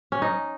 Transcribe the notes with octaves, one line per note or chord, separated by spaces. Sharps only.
C#4
D#4